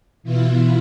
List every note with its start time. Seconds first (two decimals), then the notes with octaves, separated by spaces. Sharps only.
0.23 B2 E3 E4 F4